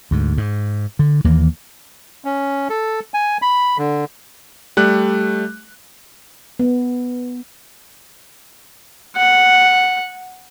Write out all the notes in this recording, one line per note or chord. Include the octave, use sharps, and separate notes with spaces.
D2 G#2
G#2
D3
D#2 E3 A#3
C#4
A4
G#5
B5
D3
G3 A3 F#6
B3
F#5